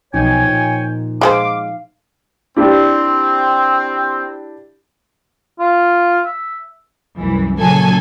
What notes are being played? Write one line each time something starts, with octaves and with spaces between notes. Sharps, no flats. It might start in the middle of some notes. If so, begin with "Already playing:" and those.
B1 F3 D#4 C#5 G5 G#5
A#2
G#3 G#4 C5 F5 D6
C4 D4 E4 G4
F4
E5
C2 F#2 E3
A#2 C#3 F#3 A4 G#5 A5